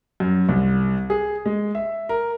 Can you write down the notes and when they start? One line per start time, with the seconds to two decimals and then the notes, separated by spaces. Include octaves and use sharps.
0.20 F#2
0.49 C2
1.10 G#4
1.46 G#3
1.75 E5
2.09 A#4